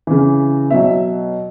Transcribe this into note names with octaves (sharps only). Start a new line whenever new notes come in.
C#3 E3
B2 F#3 E5